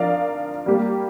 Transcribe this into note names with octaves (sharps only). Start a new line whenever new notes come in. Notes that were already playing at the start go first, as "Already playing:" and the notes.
Already playing: F3 D4 A#4 D5 F5
G3 A#3 G4